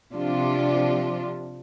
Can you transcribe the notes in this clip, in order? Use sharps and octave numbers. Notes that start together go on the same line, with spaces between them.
C3 F3 D4 F4